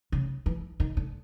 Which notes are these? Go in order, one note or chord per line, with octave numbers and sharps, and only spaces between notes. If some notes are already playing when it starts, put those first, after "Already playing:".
C#3
E3
D#3
D3